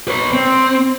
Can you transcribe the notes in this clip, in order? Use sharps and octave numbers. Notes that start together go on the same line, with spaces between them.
B4 C#5
C4